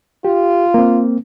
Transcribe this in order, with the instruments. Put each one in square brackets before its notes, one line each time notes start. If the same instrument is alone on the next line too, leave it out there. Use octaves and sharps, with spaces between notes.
[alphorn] F4 [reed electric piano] G4
[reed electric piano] A#3 C4